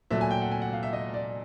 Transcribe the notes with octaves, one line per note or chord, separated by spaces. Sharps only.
A#2 F#3 A3 E5
G#5
G5
F#5
G#5
F#5
F5
E5
D#5
D5